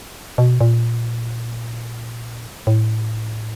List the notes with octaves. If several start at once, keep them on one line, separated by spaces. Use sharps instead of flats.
B2
A#2
A2